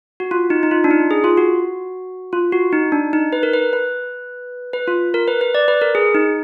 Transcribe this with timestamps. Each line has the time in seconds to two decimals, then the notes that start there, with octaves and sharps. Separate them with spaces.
0.20 F#4
0.31 F4
0.50 D#4
0.63 D#4
0.71 F4
0.84 D4
0.91 D#4
1.11 G#4
1.24 F4
1.37 F#4
2.33 F4
2.52 F#4
2.73 D#4
2.92 D4
3.13 D#4
3.33 B4
3.43 A#4
3.53 B4
3.73 B4
4.73 B4
4.88 F4
5.14 A#4
5.28 B4
5.41 B4
5.55 D5
5.68 B4
5.81 A#4
5.95 G#4
6.15 D#4